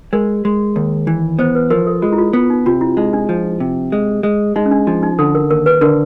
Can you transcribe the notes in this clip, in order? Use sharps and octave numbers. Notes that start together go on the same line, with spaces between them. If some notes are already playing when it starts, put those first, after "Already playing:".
G#3 A#4
G#3
D#2
E3
B3 C5
B4
F3 A#4
A4
G#3 F4
E4
F4
B3
D#4
C3 F4
E4
G#3 D#4
D4
F3
C3
G#3
G#3
G#3 D#4
C#4
D4
F3 D4
D#4
D3 A4
A#4
D#2 A#4
B4
D3 A#4